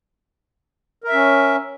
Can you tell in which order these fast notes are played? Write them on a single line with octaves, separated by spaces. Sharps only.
A#4 E5 C#4